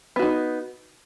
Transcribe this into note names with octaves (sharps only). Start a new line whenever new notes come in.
B3 D#4 F#4